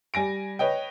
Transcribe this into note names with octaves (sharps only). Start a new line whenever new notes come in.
G3 G#5 A#6 D7
B4 C#5 D#5 G5